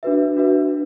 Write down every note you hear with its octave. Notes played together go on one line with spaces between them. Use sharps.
D4 F#4 B4 E5
D4 F#4 B4 E5